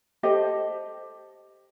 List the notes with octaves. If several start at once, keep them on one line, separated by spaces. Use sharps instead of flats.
G4 A4 C5 D#5